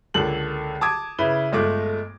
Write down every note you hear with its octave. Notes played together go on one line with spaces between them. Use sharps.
C#2 D3 A#3 A4 F#7
A5 D6 D#6 G#6
C#3 E4 B4 G7
G1 G#3 A3 F4 D6